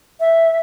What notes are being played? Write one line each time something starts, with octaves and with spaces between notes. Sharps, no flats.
E5